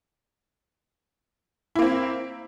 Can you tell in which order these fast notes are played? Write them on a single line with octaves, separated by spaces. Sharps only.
E4 A#3 C4